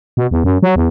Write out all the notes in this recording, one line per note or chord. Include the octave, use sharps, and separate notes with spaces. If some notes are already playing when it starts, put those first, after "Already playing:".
B2
E2
F#2
F#3
E2